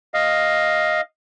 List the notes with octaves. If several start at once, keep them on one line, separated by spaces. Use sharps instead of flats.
D#5 F5